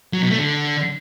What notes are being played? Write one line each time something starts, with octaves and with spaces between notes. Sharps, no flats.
F#3
B2
A3
D3